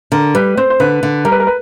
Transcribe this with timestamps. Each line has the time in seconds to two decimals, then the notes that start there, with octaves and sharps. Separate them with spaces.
0.12 D3 A#4
0.35 G3 B4
0.57 C4 C5
0.70 C5
0.80 D3 B4
1.03 D3
1.25 G3 A#4
1.32 B4
1.40 A#4
1.47 B4